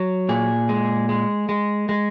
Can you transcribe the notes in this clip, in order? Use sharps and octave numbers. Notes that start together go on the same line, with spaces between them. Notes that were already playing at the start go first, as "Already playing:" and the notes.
Already playing: F#3
A#2 G#4
G#3
G#3
G#3
G#3